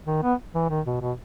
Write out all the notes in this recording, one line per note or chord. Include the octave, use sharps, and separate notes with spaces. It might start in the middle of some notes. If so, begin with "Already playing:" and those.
D#3
B3
E3
D#3
B2
B2